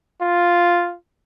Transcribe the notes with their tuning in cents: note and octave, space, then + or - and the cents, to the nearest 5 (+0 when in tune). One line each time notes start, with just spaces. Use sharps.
F4 +0